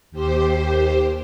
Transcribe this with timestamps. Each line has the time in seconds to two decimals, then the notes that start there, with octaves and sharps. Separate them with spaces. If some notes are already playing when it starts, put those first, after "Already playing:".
0.11 D#2 G4 C5